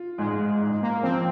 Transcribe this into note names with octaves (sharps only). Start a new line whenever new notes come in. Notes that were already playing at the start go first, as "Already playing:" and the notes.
Already playing: F4
G#2 G#3
G#2
A#3
F3 C4